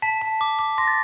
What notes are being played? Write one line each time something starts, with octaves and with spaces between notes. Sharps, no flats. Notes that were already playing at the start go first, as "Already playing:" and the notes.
A5 B6
A5
D6
D6
C6 A#6
A6